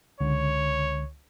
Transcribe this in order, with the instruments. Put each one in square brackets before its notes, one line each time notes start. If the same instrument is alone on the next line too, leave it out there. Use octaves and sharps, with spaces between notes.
[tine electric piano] C#2 [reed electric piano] D3 [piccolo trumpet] C#5